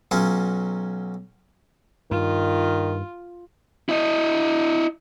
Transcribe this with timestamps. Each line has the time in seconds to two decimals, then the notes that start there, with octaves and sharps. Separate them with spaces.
0.11 B1 F#3 C#4 F4
2.11 G2 D#3 F4
3.89 E4 D#5